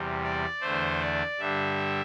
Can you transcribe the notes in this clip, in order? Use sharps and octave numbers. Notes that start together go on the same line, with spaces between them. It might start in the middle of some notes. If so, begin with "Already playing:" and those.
Already playing: E2 C3 G3
D5
E2 D3 A3 C5
D5
G2 D3 G3 E5